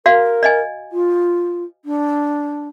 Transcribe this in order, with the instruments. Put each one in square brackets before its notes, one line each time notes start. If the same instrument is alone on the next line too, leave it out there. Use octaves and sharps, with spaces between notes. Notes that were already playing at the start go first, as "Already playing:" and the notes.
[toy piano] F#4 D5 F5 [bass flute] A#4
[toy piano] D5 D#5 G#5
[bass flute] F4
D4